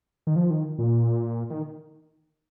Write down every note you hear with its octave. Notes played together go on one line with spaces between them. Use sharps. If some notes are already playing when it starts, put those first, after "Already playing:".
D#3
F3
D#3
A#2
D#3